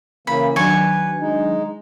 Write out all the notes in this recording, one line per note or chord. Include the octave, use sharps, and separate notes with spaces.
C#3 E3 A#3 B5
D#3 F#3 D4 B4 G#5 C#6
G#3 D#4